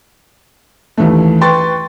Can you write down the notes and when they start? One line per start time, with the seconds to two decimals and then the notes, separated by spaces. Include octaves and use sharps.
0.98 D#2 E3 A3
1.41 B4 G5 C6 C#6 A6